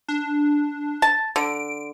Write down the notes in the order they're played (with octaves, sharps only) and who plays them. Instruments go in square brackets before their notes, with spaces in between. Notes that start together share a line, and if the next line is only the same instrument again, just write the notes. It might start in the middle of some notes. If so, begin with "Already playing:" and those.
[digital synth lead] D4
[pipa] A5
[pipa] D3 [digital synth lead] D7